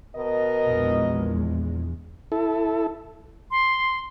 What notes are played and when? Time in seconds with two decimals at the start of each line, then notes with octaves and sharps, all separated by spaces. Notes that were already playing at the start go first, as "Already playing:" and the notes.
0.16 B2 A#4 D#5
0.67 A#1 E2 G#3
2.32 E4 A4
3.51 C6